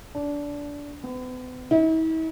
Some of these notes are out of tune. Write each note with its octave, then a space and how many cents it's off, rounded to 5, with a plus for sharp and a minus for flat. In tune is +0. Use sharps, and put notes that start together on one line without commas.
D4 -20
B3 +40
E4 -45